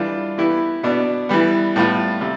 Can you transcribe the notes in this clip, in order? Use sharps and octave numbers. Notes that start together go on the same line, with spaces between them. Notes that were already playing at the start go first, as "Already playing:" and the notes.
Already playing: E3 G3 D4 F4
E3 B3 E4 G4
B2 B3 D4
E3 G3 B3
A2 G3 B3 F4
C3 G3